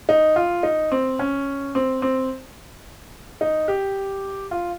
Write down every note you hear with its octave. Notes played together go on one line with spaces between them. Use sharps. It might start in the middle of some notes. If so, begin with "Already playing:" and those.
D#4
F4
D#4
C4
C#4
C4
C4
D#4
G4
F4